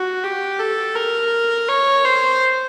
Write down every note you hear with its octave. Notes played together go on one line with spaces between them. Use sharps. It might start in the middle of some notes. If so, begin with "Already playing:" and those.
Already playing: F#4
G4
A4
A#4
C#5
C5